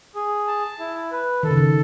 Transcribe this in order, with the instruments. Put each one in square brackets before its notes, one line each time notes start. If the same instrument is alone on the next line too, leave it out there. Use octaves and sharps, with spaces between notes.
[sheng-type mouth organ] G#4
A5
E4
B4
[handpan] D#3 [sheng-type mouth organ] A4
[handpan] C#3
D#3